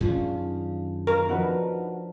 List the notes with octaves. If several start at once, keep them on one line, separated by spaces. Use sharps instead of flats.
F#2 D#3 C#4 D4 F4 G#4
A#4
F3 D4 D#4 F#4 B4